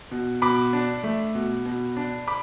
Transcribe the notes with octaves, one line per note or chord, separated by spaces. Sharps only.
B2
B2 B5 D6
D4
A3
B2
B2
D4
B5 D6